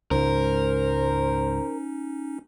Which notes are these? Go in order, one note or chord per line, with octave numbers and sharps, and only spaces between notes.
C#2 G#2 C#4 D#4 A#4 C5